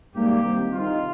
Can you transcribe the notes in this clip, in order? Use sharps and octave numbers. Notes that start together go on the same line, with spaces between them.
G#2 G3 A#3 G4
C2 C3 D#3 A#3
C2 C3 D#3 F4